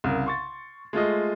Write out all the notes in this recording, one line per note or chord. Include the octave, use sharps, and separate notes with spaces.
C2 C#3 A#4
C6 C#6 A6
G#3 A3 F4 D#5